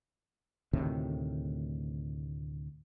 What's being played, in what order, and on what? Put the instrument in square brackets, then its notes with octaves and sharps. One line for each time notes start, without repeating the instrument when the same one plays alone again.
[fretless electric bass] D2 A2 C3 D#3